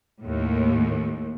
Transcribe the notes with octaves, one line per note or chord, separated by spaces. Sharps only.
D#2 A2